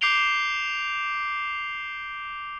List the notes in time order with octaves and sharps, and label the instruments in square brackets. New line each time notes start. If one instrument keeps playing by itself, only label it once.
[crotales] D6 G6 C7 D7 F7 G7